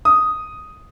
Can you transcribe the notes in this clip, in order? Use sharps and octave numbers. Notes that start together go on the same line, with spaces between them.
D#6